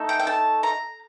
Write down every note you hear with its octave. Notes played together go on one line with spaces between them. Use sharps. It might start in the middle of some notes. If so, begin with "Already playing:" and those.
Already playing: A3 D#4 A4
G5
G5
A5
A#5